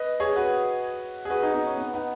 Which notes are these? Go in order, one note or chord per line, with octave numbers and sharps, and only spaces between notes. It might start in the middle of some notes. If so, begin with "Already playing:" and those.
Already playing: B4 D#5
G#4 C#5
F#4 B4
G#4
F#4 B4
D#4 G#4
B3 D#4
C#4
B3
B3 D#4